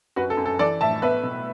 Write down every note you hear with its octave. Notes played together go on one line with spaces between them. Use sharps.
F#2 F#4 B4
A4
F#2
A4
E3 A4 D5
A2 E5 A5
B3 B4 E5
B2